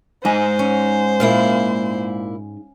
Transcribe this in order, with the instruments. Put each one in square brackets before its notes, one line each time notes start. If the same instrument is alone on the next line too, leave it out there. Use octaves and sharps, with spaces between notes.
[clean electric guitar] G#2 G#3 G#5 [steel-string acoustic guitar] D#4 [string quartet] C5
[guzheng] C#4
[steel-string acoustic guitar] A#2 A#3 E4 [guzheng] F5